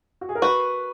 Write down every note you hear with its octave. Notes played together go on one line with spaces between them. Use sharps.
F#4
G#4
A#4
F#4 B4